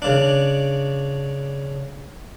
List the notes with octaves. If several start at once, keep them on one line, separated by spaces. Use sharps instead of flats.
C#3 D4